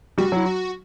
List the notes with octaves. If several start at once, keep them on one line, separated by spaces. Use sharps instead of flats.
G3 F#4
F#3 E4
F#4